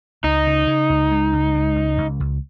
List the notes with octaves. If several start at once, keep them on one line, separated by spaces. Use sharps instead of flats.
C#2 D#4
C#3
C#3
C#2
G#3
C#2
G#3
C#2
C#2
C#2